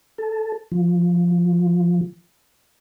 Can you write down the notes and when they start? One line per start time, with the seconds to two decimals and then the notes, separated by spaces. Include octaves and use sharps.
0.18 A4
0.72 F3